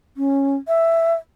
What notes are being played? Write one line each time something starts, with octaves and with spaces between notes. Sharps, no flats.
C#4
E5